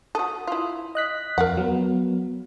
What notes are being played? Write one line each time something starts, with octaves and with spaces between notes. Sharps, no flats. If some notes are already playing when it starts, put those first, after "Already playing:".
F#4 A4 D#6
E4 F4
D#5 F#6 B6
F2 A#4 F5 F#5
F#3 B3